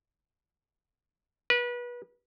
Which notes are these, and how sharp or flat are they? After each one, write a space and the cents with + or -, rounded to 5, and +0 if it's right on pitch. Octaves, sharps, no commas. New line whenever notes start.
B4 -30